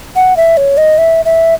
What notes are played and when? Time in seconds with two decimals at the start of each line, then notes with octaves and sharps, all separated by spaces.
0.16 F#5
0.37 E5
0.57 C#5
0.77 D#5
0.98 E5
1.25 E5